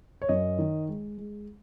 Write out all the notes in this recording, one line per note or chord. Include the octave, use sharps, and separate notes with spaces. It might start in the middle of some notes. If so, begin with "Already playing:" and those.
C#5
F#2 D#5
D#3
G#3
G#3